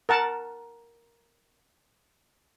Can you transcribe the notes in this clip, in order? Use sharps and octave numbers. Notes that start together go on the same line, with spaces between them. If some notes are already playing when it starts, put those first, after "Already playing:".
A#4 F#5 A5